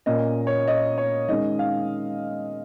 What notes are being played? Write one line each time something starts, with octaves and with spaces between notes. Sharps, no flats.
A#2 A#3 C#4 D#5
C#5
D#5
C#5
D#3 G#3 C#4 D#5
F5